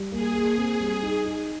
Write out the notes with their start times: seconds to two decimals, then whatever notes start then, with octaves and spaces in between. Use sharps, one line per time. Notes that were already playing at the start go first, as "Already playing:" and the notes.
Already playing: G3
0.12 A#3 G#4
0.34 A#3
0.58 C4
0.80 G3
1.03 D#4
1.25 D#4